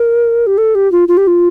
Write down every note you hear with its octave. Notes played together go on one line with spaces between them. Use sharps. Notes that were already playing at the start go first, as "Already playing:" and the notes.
Already playing: A#4
G4
A4
G4
F4
F4
G4
F4